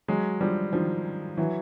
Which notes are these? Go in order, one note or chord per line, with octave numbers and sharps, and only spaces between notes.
F#3 G#3
F3 G3
D#3 F3
E3 F#3